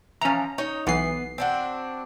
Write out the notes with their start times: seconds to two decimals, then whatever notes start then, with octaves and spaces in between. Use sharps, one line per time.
0.21 E3 F3 C#4 A#5
0.58 D#4 C#5
0.87 B1 E3 B3 C7
1.38 C4 D4 F#4